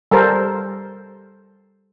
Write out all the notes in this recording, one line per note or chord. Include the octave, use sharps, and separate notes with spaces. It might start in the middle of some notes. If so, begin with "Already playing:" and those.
G3 A4 A#4 C5